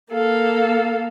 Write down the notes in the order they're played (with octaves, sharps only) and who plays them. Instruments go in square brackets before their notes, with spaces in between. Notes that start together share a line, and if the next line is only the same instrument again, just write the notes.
[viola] A#3 [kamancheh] A4 F5